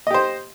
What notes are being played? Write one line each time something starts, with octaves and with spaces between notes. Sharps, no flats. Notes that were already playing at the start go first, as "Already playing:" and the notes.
G4 C5 D#5